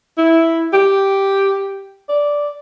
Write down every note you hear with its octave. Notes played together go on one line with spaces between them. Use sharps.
E4
G4
D5